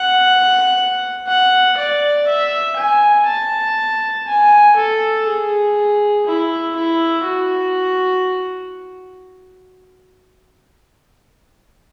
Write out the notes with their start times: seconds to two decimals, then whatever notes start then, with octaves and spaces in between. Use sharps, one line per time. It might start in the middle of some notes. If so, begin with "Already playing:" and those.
Already playing: F#5
1.27 F#5
1.77 D5
2.27 E5
2.77 G#5
3.26 A5
4.27 G#5
4.77 A4
5.27 G#4
6.27 E4
6.76 E4
7.25 F#4